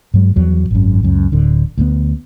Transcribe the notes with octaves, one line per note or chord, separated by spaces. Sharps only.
G2 F#3 G#3
E2 F3 F#3
G#1 F#2
C#2 F#2
D1 D3
D2 C#3 B3